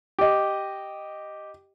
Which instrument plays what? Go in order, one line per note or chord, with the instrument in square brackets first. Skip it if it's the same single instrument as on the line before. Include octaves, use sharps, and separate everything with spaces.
[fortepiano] G4 D#5